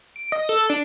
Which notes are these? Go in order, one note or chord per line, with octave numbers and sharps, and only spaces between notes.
D7
D#5
A4
D4